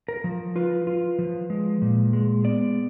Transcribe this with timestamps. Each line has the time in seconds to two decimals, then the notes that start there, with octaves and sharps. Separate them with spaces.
0.08 A#4
0.24 F3
0.56 F4 B4
0.87 F4
1.19 F3
1.50 G#3
1.82 A#2
2.13 G#3
2.44 B3 D5